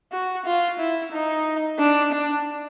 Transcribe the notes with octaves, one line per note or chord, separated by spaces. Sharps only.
F#4
F4
E4
D#4
D4
D4